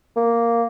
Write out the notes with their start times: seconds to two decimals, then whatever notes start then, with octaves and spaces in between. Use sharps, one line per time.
0.16 A#3